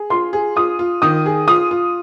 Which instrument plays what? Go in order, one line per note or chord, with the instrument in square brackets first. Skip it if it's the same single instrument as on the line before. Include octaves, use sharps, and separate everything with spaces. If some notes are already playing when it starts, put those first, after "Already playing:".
Already playing: [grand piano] G#4
[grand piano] F4 [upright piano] C6
[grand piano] G#4
[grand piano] F4 [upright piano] D#6
[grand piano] F4
[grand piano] D#3 [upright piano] D#6
[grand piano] G#4
[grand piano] F4 [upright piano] D#6
[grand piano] F4